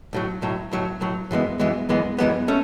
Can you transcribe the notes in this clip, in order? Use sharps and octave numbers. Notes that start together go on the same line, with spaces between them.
B1 A2 F#3
B1 A2 F#3
B1 A2 F#3
B1 A2 F#3
F#2 E3 G#3 B3
F#2 E3 G#3 B3
F#2 E3 G#3 B3
F#2 E3 G#3 B3
A3 C#4